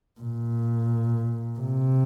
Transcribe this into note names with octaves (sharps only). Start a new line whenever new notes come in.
A#2
C3